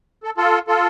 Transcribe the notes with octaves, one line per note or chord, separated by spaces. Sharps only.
A4
F4 A4
F4 A4